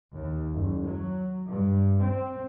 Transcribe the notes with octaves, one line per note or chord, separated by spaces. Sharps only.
D#2
F#1
F#3
G2
C4